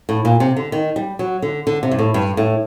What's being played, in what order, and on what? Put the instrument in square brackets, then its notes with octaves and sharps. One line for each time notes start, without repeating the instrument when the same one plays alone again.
[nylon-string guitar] A2
A#2
C3
D3
D#3
G3
F#3
D3
D3
C3
G2
A2
G2
A2